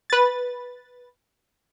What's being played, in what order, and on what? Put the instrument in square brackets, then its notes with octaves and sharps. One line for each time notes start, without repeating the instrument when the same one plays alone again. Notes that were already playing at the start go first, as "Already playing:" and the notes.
[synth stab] B4 A6